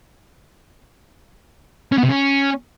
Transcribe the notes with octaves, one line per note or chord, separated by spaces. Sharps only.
C#4
B3
C3
C#4